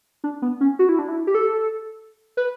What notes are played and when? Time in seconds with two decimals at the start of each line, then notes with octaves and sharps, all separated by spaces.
0.24 D4
0.42 B3
0.61 C#4
0.79 F#4
0.89 E4
0.99 D4
1.08 E4
1.27 G4
1.35 A4
2.37 B4